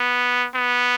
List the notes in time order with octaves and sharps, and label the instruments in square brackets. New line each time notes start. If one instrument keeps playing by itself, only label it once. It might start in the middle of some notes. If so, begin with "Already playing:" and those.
Already playing: [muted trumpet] B3
B3